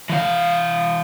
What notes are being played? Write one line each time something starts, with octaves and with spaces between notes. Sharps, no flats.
E3 F5